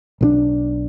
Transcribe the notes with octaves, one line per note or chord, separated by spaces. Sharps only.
B1 D#3 D4